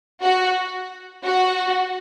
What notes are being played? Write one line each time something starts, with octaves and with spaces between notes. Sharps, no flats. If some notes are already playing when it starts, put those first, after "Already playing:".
F#4
F#4